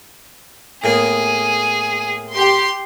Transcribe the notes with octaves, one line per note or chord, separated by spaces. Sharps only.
A2 A#3 B3 G#4
G4 C6